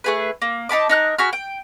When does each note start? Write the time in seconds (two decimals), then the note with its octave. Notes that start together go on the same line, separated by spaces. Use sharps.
0.04 A3 G#4 B4
0.42 A#3
0.69 D#4 A5 B5 D6
0.89 D#4 A#4 F#6
1.18 F#4 G#4 B5 F6
1.33 G5